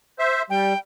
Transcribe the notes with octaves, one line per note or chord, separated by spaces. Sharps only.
C5 E5
G3 G5